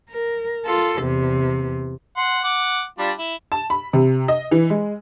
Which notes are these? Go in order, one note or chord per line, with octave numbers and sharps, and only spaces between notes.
A#4
F4 A4
E2 C3
F#5 C6
F#5 D6
G3 D4 F4
E4
A5
B5
C3
D#5
E3
G#3